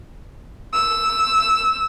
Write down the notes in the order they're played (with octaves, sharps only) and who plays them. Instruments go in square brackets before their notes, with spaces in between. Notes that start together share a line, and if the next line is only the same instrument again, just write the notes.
[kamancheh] E6